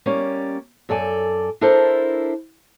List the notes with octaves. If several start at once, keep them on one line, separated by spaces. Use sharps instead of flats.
G3 A#3 C#4 D5
F#2 A4 D5 G#5
D4 E4 A4 A#4 C5